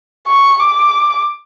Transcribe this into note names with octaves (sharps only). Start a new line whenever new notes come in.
C#6
D6